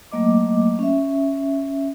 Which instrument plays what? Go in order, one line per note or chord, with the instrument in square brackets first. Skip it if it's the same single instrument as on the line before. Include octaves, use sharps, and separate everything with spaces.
[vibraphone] F#3 A3 A#3 D#5 D6
C#4 E5